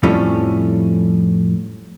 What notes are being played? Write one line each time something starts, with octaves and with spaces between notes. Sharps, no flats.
F2 A2 F3 G3 A3 C#4